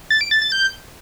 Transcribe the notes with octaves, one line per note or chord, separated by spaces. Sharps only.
A6
D7
A6
A6
G6